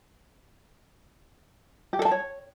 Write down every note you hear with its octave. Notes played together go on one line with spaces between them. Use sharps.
G4
A4
A5
C#5